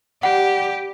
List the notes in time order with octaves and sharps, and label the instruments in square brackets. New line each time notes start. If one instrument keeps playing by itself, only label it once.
[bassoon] G3 [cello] G4 [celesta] F#5